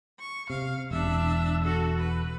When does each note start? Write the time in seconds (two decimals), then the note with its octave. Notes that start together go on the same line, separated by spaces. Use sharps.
0.19 C#6
0.50 C3 F5
0.91 E1 D4 E5
1.64 F#4 A4
1.98 B4